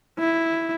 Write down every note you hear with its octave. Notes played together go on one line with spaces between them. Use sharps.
E4